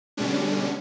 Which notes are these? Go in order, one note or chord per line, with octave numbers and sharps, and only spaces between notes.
B2 D3 G3 G#3 C#4 D4